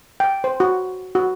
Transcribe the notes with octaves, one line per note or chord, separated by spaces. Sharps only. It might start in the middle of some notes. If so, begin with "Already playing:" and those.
G5
C5
F#4
F#4